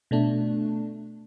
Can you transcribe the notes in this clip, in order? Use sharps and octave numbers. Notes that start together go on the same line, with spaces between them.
B2 A3 D4